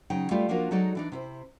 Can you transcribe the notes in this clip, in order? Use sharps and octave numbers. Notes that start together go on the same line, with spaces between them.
C#3 F#3 D#4 G5
G3 A3 F4 G4 F5
F3 A#3 D4 F4 F#4 A#4
F#3 G#3 D#4 F#4 A4 D5
E3 D4 D#4
C3 E4 C5